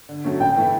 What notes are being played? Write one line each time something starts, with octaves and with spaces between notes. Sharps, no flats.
D3
F#3 A3 C#4
A2 G5
E3 A3 E4